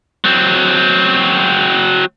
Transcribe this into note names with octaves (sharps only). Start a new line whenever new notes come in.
F#3 C4